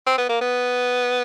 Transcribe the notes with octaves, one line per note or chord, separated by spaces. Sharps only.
C4
B3
A#3
B3